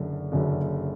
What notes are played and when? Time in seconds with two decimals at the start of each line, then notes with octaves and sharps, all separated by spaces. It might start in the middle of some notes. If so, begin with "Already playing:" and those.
Already playing: F#1 F#2 D3
0.32 F#1 F#2 D3